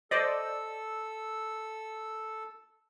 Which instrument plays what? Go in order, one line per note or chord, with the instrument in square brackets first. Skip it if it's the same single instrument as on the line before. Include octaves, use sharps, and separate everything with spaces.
[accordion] A4 E6 [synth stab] C5 D5 D#5